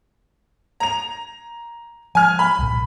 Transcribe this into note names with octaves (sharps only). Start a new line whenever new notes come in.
A#5 F7
F3 G#5 F6
B5
C2 A#2